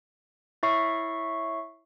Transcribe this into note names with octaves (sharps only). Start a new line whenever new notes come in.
E4 C#5 E5 C#6 C7